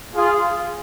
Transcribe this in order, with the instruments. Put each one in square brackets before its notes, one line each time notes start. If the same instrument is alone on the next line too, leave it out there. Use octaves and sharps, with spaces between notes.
[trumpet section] F4 G#4